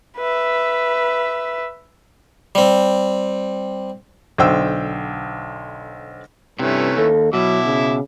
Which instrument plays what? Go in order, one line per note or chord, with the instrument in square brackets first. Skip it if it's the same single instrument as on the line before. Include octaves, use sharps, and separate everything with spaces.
[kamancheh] B4 E5
[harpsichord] G3 C4
[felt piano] B1 D3 C5 G5 E6
[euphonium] G2 [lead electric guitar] C3 [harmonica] E3 A3 C#4
[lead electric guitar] D#2 [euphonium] A4
[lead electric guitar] B2 [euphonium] F#3 [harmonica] E4 E5 D6
[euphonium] C#3